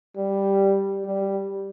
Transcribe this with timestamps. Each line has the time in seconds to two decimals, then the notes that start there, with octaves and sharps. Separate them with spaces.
0.16 G3
1.05 G3